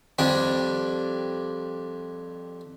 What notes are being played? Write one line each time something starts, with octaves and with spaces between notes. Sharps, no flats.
F2 G3 D4